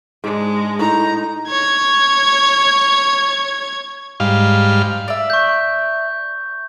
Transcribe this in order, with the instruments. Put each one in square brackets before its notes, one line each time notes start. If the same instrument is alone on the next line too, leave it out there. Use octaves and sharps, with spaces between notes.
[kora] G#2 D4 [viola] G#3
[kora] A2 [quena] D#4 [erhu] A#5
[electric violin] C#5 G#6
[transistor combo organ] G#2 G3 F5
[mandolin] D5 E5
[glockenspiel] C#6 G6